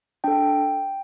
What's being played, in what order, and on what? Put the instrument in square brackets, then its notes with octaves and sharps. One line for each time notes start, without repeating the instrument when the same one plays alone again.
[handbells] D4 A4 G5